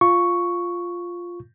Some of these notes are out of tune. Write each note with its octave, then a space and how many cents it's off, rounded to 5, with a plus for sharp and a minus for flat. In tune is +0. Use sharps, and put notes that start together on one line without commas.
F4 +0 C#6 +5